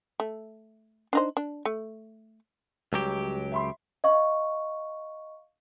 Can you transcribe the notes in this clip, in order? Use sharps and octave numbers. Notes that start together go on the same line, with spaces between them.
A3
D4 D#4 C5
D4
A3
C#2 F#3 G3 G4
E5 B5 C6
D#5 F5 C#6